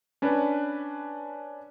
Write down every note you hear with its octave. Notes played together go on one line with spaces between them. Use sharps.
C#4 D4 B4